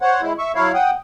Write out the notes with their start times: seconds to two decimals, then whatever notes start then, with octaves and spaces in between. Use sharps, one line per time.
0.02 C5 C#5 F#5
0.21 G#3 E4
0.38 E5 C#6
0.55 F#3 E4 C#5 F5
0.74 F#5 G5 D#6